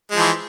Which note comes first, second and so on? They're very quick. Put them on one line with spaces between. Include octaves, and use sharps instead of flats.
G#3 F3 E3